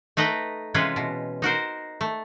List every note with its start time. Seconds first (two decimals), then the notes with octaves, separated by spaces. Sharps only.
0.17 A3 D#4 B4 D#5 G5
0.74 C3 E3 G#3 C#4 F4 B4
0.96 B2
1.42 D#4 F#4 A#4 C5
2.01 A3